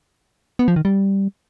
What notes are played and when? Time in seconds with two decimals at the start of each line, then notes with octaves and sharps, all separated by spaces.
0.59 B3
0.68 F3
0.76 D#3
0.85 G3